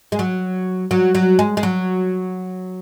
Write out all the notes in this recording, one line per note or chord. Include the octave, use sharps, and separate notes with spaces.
G#3
F#3
F#3
F#3
G#3
G#3
F#3